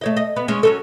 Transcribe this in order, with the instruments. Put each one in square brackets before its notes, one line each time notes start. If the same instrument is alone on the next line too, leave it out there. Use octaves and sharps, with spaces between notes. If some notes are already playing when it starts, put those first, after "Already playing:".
[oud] A3 C#5 D#5
D#5
B3
G#3 C#4
F#3 C#4 A4